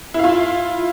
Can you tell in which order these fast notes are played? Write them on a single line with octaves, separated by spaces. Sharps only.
E4 F5 F4